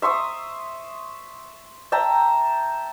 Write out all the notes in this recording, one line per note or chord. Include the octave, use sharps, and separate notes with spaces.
E5 C6 C#6 D#6
E5 G5 A5 A#5